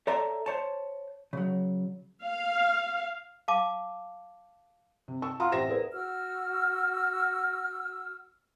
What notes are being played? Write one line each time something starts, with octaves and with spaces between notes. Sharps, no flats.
A4 C#5 D5 E5 A5 A#5
C5 C#5 A5
C#3 F#3
F5
F5 A5 D6
C3
A5 C#6 E6
F4 F#5 A#5 D#6
A1 C3 A#6 E7
E2 A#4 C5 E5
F#4 E6 F6